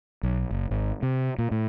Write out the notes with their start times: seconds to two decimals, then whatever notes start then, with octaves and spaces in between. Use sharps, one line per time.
0.23 B1
0.51 F#1
0.71 G#1
1.03 C3
1.38 A#2
1.51 A2